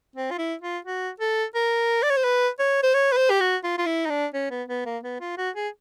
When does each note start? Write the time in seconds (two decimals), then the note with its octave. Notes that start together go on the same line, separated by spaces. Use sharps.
0.16 C4
0.31 F4
0.38 E4
0.62 F4
0.85 F#4
1.20 A4
1.55 A#4
2.03 D5
2.10 C#5
2.17 C5
2.24 B4
2.59 C#5
2.83 C5
2.94 C#5
3.12 B4
3.17 C5
3.30 G4
3.40 F#4
3.64 F4
3.78 F4
3.86 E4
4.06 D#4
4.10 D4
4.34 C#4
4.51 B3
4.68 B3
4.86 A#3
5.03 B3
5.21 F4
5.37 F#4
5.56 G#4